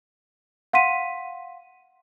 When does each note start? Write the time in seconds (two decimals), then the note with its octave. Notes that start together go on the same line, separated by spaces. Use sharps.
0.73 F5 F#5 C6 B6 D#7